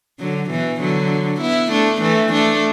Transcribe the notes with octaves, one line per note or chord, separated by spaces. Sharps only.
D3 F#3
B2 E3
D3 F#3
B3 E4
A3 D4
E3 A3
A3 D4